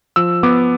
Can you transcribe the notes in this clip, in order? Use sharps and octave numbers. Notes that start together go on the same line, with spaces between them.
F3 E6
B3 D6